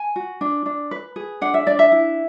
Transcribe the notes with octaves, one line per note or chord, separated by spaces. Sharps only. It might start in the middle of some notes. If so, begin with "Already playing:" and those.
Already playing: G#5
F#4
D4
D4
B4
G#4
D4 F#5
E5
D4 D5
E5
E4